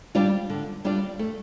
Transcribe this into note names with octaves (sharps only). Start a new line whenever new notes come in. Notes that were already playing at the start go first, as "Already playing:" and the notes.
G3 D4 F4 D5
D3
G3 D4 F4 D5
A3